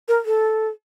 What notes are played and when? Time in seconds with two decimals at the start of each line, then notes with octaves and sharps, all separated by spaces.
0.08 A#4
0.26 A4